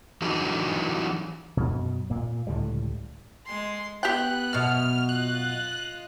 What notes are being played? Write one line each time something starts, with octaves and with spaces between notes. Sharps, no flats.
E3 F#3 G3 D4 D#4 G#4
F#2 B2
A#2 A#3
C#2 A2 D3 G3
G#3 C6
B3 G4 G5 F#6
F#2 B2 F6
F4 D#5 F#6